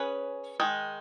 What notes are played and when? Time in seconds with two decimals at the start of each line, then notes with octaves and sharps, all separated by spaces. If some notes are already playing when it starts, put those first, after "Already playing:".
Already playing: C#4 G#4 B4
0.60 D#3 G#3